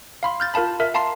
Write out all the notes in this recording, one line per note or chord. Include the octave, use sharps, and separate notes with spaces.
F5 B5 C6
F6 G6 A6
F4 A#4 F5 A5 B5
A#4 E5
F5 A5 A#5 C6 C7